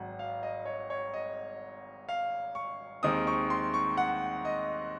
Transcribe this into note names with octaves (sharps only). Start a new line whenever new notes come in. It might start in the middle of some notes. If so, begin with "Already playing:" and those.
Already playing: G#1 G#2 F#3 F#5
F5
D#5
C#5
C#5
D#5
F5
C#6
D#2 D#3 G#3 C4 D#6
C#6
C6
C#6
F#5
D#5